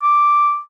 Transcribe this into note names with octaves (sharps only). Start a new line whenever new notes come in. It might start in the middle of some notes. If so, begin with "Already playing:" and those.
D6